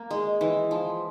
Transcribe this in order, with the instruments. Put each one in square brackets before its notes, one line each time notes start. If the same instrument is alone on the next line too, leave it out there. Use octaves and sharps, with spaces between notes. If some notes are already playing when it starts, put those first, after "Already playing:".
Already playing: [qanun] A#3
G#3
E3
F3